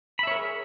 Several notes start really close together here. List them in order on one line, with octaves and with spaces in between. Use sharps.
B5 E5 C#5 A#4 G#4